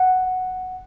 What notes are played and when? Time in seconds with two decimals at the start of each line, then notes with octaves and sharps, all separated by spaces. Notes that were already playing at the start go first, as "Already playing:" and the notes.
Already playing: F#5